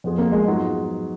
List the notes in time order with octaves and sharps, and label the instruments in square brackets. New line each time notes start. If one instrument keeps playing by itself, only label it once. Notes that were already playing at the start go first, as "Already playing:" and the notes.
[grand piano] F2 F3 B3 F4 G#4
[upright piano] A#3
G#3
[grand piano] G#2 F#3 B3 F4 G#4